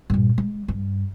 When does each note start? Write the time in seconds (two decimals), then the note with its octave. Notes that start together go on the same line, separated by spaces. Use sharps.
0.10 G2 A#2
0.38 G#3
0.68 G2